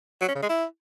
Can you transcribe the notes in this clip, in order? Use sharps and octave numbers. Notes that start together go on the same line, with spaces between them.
F#3
C#4
C#3
G#3
E4